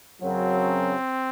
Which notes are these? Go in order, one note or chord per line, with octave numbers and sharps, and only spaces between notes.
F#2 C#3 F#3 C4